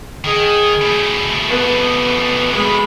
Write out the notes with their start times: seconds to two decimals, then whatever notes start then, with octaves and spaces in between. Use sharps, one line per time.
0.24 D#3 G#4
0.81 B2 A3
1.49 B3
2.53 G#3 B5